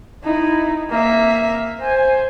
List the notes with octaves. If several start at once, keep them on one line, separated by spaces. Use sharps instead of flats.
D#4 E4
A#3 E5
C5 G#5